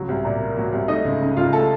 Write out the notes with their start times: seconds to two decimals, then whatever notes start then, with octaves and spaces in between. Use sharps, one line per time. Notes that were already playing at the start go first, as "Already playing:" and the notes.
Already playing: C#2 F#3
0.09 C2
0.25 A#2
0.40 A#3
0.57 F#3
0.72 C2
0.88 A3 D#4 D#5
1.05 C#2
1.21 C#3
1.36 C#2 F4 F5
1.53 A3 A4 A5